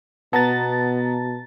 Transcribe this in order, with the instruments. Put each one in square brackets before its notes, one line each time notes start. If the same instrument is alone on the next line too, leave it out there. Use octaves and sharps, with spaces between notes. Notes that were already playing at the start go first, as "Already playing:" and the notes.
[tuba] B2 [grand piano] B3 [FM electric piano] A5 A#5 A6